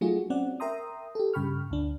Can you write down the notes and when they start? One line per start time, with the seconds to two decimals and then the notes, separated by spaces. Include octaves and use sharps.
0.01 F#3 A3 D#4 F4 F#4 G#4
0.30 C4 C#4 D5 F#5
0.60 A#4 E5 G5 A#5 C6 D#6
1.15 G4 A4
1.34 G2 C#3 G5 B5 C#6 F6
1.70 D2 D4